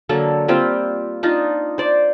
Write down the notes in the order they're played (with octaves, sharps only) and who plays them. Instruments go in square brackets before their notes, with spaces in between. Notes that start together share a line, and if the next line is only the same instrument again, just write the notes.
[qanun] D3 F#3 A#3 A4
G3 A#3 C4 F4
D4 D#4 F4
C5 D5